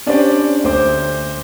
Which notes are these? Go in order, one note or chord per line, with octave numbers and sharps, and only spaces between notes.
C#4 D4 G4 C5 D5
D2 C5 D6